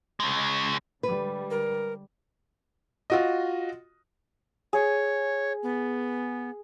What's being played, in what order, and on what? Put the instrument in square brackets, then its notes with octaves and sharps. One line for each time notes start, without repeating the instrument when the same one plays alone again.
[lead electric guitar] C#3 G#3
[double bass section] D3 G3 G#3 [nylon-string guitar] B4
[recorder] A#4
[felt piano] F4 F#4 D#5
[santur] G#4 [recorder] C#5
[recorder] B3